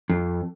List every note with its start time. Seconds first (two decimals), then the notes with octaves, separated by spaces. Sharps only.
0.09 F2